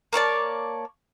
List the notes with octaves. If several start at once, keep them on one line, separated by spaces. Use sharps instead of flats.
A#3 C#5 D5 A5